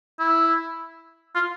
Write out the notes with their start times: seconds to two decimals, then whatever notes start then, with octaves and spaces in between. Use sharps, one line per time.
0.19 E4
1.35 F4